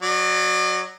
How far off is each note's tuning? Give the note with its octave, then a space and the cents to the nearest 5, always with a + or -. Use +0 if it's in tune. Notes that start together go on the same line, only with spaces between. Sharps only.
F#3 +0 D5 +40